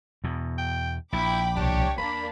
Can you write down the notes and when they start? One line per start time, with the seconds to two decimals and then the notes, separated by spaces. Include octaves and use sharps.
0.24 E2 B2
0.58 G5
1.13 A#1 E4 G5 B5 D6
1.56 C2 B2 D4 G4 C#5
1.98 E2 A#3 D4 B5